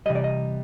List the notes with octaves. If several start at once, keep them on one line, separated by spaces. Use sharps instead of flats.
C3 E3 G3 D#5
D5
D#5